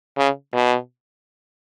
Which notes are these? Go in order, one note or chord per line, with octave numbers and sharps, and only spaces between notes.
C#3
B2